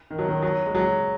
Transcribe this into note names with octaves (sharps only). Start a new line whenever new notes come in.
D#3
F#3
D#3
F#3
G#3
F#3